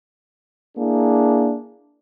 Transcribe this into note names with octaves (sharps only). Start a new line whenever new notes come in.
A#3 D4 E4 G#4